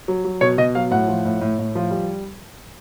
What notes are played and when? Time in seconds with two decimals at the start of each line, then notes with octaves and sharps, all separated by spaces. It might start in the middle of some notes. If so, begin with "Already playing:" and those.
0.08 F#3
0.25 F#3
0.41 B2 C#5
0.58 B2 D#5
0.75 F#3 F5
0.91 A2 F#5
1.08 F3
1.25 A2
1.41 A2
1.59 A2
1.75 F3
1.91 G3